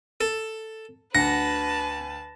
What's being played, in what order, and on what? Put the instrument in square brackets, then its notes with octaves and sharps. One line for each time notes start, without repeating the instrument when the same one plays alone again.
[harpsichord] A4
[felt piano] D2 [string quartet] B4 A5 [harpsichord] F#5 [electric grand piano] A#6